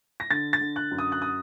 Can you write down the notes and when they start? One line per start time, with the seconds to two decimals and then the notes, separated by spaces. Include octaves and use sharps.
0.20 A#6
0.31 D3 A6
0.53 A6
0.61 D3
0.76 F#6
0.91 F#2
0.98 D#6
1.12 F#6
1.22 D#6